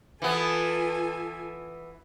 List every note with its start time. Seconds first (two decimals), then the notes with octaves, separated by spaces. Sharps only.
0.22 E3 B3 F4 A4 G#5